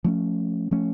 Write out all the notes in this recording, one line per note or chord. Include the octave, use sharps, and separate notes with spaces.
F3 A3 C#4
F3 A3 C#4